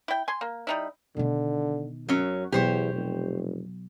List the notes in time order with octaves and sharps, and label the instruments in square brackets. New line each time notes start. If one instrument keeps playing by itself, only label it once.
[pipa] E4 G5
G#5 C6
A#3
G3 D#4 E4
[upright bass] B2 D#3 [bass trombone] D3
[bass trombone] F#2 [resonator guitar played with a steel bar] F#3 C#4
[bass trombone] E2 [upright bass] B2 F#3 [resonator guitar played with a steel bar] G4 C5 C#5
[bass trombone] F1